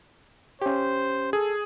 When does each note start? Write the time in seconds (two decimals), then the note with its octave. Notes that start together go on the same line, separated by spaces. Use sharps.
0.62 C#4 G4 C5
1.33 G#4 A4